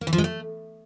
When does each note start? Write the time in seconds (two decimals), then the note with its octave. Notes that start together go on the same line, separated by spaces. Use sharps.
0.01 A#3
0.07 E3
0.13 F3
0.18 G#3
0.24 A3